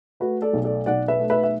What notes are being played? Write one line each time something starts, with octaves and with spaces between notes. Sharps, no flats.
A3 F#4 B4
A4 D5
B1
A4 D5
B1 D5 F#5
B4 E5
A3
B4 E5
E5